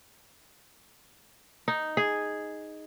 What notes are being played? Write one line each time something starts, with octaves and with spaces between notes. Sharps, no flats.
D#4
G#4